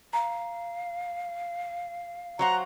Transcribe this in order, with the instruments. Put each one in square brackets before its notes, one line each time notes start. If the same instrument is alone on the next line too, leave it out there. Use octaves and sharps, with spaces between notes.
[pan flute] F5 [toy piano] A#5
[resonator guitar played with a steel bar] F#3 C5 F#5 [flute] A#5